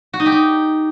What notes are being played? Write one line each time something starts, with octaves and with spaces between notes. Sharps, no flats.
F#4
D#4
G4
D#4